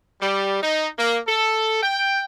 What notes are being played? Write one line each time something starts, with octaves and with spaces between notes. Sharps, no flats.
G3
D#4
A#3
A4
G5